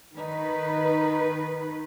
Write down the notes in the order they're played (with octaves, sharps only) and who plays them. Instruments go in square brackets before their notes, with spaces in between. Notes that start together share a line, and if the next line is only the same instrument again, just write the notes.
[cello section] D#3 B4 [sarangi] D#4